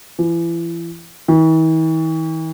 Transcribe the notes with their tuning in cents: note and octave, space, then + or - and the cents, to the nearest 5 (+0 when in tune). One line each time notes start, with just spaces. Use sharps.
E3 +35
E3 -45